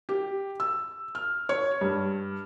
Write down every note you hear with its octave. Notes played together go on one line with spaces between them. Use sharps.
G4
E6
F6
C#5
G2